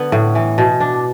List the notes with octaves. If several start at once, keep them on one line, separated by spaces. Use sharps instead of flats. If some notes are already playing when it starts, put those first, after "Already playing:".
Already playing: D3 B3
A2
E3
B2
D4